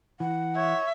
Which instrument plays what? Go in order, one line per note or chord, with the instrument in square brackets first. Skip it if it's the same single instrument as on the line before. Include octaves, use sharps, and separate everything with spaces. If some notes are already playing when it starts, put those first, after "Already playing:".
[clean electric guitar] E3 [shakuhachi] F#5
[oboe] C#5 [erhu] E5